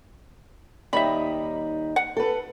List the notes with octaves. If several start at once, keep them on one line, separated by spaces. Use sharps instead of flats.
D#2 G3 D#4 E5 B5
F#5
A4 B4